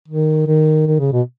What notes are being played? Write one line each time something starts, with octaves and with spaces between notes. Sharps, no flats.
D#3
D#3
D#3
C#3
B2